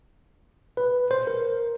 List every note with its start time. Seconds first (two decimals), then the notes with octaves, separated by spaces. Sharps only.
0.77 B4
1.11 C5
1.27 A#4